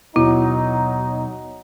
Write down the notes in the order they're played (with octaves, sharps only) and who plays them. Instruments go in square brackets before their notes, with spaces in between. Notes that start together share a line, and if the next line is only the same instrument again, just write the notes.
[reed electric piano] D#2 B2 B3 [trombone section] F#3 D#4 [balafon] E4